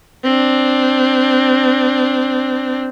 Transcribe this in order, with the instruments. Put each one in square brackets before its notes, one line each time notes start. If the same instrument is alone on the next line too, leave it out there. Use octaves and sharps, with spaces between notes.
[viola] C4 D4